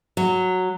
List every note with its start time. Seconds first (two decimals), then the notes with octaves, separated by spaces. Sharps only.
0.17 F#3